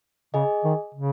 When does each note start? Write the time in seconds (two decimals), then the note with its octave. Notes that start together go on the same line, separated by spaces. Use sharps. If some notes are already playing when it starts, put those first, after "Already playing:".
0.34 C#3 G#4 D#5 G#5
0.64 D#3
0.94 C#3